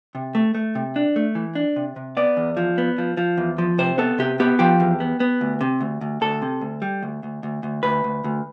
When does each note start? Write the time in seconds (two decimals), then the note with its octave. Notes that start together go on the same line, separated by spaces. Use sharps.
0.15 C3
0.35 A3
0.55 A3
0.75 C3
0.96 D4
1.16 A3
1.35 E3
1.55 D4
1.76 C3
1.96 C3
2.17 B3 D5
2.37 E2
2.57 F3
2.78 B3
2.98 F3
3.17 F3
3.38 E2
3.58 F3
3.78 C3 C5
3.98 B3 A4
4.19 C3 G4
4.40 B3 G4
4.59 F3 G4
4.80 E2
5.00 B3
5.20 B3
5.41 D2
5.61 C3
5.81 D2
6.01 D2
6.21 D2 A4
6.42 C3
6.61 D2
6.82 G3
7.03 D2
7.23 D2
7.43 D2
7.63 D2
7.83 D2 B4
8.04 D2
8.24 D2